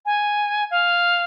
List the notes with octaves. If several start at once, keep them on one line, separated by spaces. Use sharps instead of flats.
G#5
F5